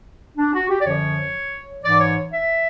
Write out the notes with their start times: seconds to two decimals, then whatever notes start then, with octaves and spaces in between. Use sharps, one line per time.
0.37 D4
0.54 F#4
0.69 G4
0.81 D5
0.86 F#2 D3 F3 C#5
1.84 G#2 E3 D5
2.00 C#5
2.33 E5